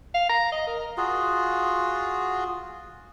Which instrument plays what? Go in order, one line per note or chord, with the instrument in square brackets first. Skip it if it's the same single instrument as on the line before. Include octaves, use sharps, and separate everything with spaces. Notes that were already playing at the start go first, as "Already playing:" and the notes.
[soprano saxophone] F5
A#5
D#5
A#4
[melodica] F4 F#4 G#4